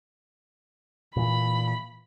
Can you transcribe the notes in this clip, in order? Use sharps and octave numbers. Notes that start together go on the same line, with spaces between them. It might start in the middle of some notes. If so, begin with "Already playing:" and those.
A#2 E3 B5